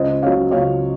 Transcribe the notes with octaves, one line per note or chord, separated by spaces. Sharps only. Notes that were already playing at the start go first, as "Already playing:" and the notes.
Already playing: C#2 C5 D#5
C#3 F#3 C#5 F5
C#2 C#5 F5